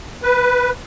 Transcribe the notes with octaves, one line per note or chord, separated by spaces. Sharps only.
B4